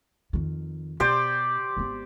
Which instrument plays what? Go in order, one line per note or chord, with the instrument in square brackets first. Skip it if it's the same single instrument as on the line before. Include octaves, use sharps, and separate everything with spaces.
[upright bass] F2 D#3
[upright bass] B2 [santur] G4 C5 D5
[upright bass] G#1 B3